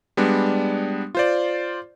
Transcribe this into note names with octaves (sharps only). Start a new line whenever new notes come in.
G3 G#3 B3 D4
F4 C5 D5